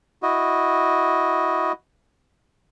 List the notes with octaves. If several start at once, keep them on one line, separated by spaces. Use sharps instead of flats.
E4 F#4 D#5